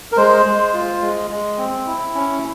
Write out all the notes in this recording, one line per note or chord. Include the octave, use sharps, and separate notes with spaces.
A#4
G#3 C5
G#3
F4
G#3
G#3
C4
E4
C#4